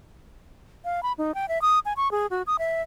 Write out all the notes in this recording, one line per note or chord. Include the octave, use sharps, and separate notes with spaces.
F5
B5
D#4
G5
E5
D#6
G#5
C#6
G#4
F#4
D#6
E5